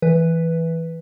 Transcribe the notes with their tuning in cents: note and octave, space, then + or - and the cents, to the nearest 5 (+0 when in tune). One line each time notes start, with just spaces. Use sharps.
E3 +0 B4 +0